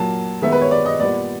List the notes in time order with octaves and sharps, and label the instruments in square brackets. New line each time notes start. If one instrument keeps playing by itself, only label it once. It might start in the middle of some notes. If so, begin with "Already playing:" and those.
Already playing: [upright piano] A#2 F#3 A#3 A5
D#3 G#3 B3 E5
B4
C#5
D5
D#5
A#2 G3 B3 D5